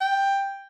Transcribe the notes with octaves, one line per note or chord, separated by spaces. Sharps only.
G5